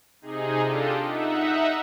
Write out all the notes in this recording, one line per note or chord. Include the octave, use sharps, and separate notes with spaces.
C3 D#4 G#4
D4 F4 G4 A4 D#5
D#4 E5 F#5